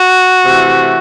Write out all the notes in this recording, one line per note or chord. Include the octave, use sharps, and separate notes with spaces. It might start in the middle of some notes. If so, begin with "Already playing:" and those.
Already playing: F#4
C3 E3 A3